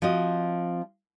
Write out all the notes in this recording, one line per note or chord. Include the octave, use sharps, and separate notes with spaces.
F3 C4 F#4 D#5